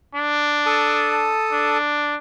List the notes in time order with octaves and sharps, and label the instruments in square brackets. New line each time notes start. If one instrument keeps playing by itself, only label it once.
[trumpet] D4
[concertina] A4 A5 D#6
[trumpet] D4